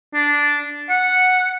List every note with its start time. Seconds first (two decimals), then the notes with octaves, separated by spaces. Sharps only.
0.14 D4
0.90 F#5